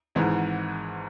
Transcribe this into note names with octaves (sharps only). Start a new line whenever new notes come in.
G#1 G#2 E3 G#3